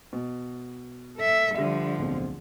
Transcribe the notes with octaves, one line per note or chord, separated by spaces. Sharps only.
B2
A4 E5
D3 F3 G3 E5
D1 B1 C4